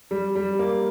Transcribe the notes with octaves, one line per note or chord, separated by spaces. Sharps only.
G3
G3
A#3